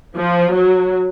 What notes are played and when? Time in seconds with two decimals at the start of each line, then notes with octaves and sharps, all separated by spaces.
0.15 F3
0.53 F#3